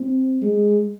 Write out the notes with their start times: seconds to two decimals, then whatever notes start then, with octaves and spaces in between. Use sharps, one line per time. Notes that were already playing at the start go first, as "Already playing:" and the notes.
Already playing: C4
0.42 G#3